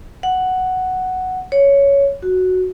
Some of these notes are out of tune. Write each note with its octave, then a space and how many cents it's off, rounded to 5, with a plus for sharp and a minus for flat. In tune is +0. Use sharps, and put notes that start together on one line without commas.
F#5 +5
C#5 +10
F#4 +0